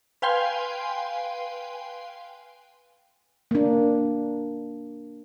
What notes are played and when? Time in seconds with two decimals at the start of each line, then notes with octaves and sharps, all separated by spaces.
0.22 B4 F5 G5 G#5 C6
3.51 A#3 D4